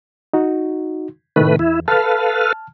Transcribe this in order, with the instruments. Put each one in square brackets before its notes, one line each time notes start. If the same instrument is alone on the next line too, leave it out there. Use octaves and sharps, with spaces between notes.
[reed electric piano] D#4 F#4
[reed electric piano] A2 C3 D#3 [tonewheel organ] A3 B4
[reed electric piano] E2 [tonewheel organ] E4
[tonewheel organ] A4 B4 F5 [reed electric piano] A5 F6